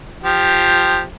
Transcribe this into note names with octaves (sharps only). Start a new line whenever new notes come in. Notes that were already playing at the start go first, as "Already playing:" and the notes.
F3 G4